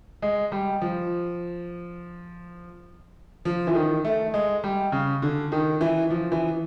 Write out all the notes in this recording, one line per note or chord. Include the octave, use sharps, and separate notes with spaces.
G#3
G3
F3
F3
E3
D#3
A3
G#3
G3
C#3
D3
D#3
E3
F3
E3